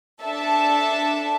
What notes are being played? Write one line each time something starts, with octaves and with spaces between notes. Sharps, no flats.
D4 A4 E5 A5